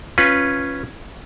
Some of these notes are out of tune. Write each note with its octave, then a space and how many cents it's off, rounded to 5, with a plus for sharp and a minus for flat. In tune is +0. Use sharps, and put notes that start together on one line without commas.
C#4 -5 F4 +0 B4 +0